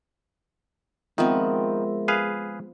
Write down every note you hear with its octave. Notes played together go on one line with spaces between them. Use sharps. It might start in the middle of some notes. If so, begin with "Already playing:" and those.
D#3 F3 G#3 B3 C4 A#4 E5
G#4 B4 F5